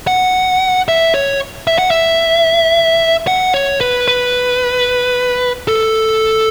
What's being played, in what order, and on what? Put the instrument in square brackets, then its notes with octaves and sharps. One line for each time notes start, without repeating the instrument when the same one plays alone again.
[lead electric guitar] F#5
E5
C#5
E5
F#5
E5
F#5
C#5
B4
B4
A4